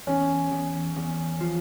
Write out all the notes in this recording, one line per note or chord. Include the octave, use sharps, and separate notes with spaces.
E2 C#4
E2
E2
F3